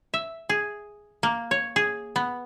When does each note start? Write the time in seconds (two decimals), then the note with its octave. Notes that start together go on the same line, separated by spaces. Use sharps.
0.14 E5
0.49 G#4
1.23 A#3
1.51 C#5
1.76 G#4
2.16 B3